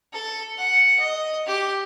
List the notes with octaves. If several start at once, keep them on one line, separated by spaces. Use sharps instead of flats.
A4
F#5
D#5
G4